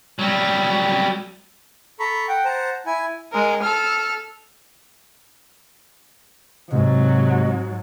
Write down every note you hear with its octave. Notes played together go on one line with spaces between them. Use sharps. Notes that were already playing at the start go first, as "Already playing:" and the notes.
F#3 G3
A4 A#5 B5 C#6
F#5 G5
C5 F#5 A5 A#5
E4 G#5
G#3 A#4
A4 F6
G#2 C3 F#3 G#3